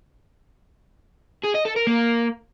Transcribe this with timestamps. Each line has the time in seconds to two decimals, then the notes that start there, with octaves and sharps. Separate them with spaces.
1.44 G#4
1.55 D#5
1.66 A4
1.76 A#4
1.87 A#3